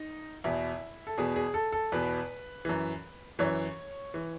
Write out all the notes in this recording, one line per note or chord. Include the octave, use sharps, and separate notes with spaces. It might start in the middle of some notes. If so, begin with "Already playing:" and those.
Already playing: D#4
E2 B2 E4
A4
E2 B2 G#4
G#4
A4
A4
E2 B2 B4
F#2 E3
F#2 E3 C#5
E3